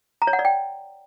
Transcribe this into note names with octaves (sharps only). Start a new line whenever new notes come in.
A#5
C#5
F#5
D5
G5